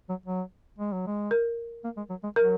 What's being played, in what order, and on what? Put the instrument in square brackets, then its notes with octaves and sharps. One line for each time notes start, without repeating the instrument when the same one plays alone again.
[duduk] F#3
F#3
G#3
F#3
G#3
[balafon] A#4
[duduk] A#3
G#3
F#3
G#3
[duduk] F#3 [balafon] A#4